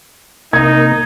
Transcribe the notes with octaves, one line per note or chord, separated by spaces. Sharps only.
C3 A#3 D#4 A#4 G#6